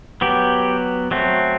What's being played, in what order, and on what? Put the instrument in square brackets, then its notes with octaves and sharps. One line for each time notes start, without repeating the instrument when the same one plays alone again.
[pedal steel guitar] F#3 B3 G4
F#3 A3 C4